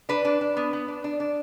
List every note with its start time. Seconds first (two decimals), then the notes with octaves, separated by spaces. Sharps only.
0.09 D4 B4
0.25 D4
0.41 D4
0.57 B3
0.73 B3
0.88 D4
1.04 D4
1.20 D4